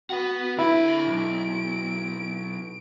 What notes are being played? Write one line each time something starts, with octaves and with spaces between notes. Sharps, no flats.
F#4 B4 F#5
D3 E4 B5 D7
B1